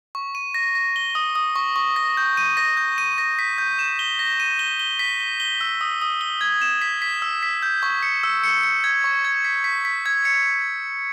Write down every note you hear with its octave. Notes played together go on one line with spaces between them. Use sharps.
C#6
D#7
A#6
A#6
G7
D#6
D#6
C#6
C#6
A#6
G6
D#7
A#6
G6
D#7
A#6
B6
G6
E7
G7
A#6
D#7
G7
G7
B6
G7
G7
E6
D#6
D#6
G7
G#6
E7
B6
B6
E6
B6
G6
C#6
C#7
E6
C#7
C#7
G#6
C#6
G#6
B6
B6
B6
G#6
C#7